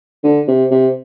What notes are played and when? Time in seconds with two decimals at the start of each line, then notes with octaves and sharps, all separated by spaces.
0.24 D3
0.48 C3
0.71 C3